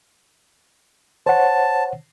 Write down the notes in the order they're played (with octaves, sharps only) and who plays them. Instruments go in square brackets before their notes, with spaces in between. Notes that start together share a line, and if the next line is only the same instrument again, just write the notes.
[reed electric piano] C5 C#5 F#5 [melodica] A5